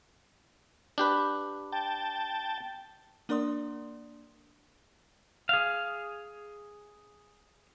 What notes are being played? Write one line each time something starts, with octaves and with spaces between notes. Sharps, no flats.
D4 G4 B4
G5 A5
A#3 D4 A#4 D5 C6 D#6
G#4 F5